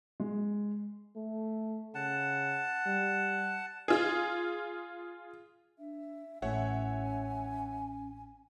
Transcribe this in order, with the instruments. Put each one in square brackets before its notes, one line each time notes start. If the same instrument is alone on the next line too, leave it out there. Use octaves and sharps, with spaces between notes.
[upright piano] G#3
[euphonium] A3
[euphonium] C#3 [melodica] F#5 A5
[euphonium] G3
[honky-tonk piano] F4 G#4
[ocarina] D4 [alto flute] E5
[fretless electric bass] A1 A2 [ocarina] C#4 [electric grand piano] C#5 E5 F#5 [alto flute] G#5